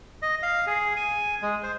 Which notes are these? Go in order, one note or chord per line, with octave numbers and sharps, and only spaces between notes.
D#5
F5
G#4
G#5
G#3
C5